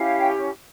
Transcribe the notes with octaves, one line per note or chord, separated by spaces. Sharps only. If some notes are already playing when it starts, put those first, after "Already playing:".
Already playing: C#4 E4 G4 F5
G5